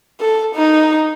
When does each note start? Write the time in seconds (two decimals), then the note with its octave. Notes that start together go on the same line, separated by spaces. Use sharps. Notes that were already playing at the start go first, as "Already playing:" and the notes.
0.20 A4
0.55 D#4